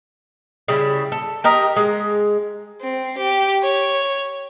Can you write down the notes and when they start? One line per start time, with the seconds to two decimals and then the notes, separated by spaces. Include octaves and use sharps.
0.68 C#3 G3 E4
1.12 A4
1.44 G4 A#4 D#5
1.76 G#3
2.82 C4
3.18 G4
3.64 C#5